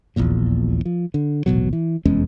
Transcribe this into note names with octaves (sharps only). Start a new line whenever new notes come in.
D#1 A#1 E2 A#2
F3
D3
D#1 A1 B2 F#3
E3
F1 E2 G#3 C#4